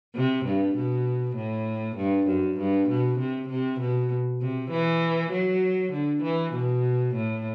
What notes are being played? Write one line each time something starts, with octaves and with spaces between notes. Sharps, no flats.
C3
G2
B2
A2
G2
F#2
G2
B2
C3
C3
B2
C3
E3
F#3
D3
E3
B2
A2